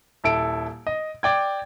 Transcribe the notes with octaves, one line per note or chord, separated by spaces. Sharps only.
D#1 E4 A4 D7
D#5
D5 G5 G#6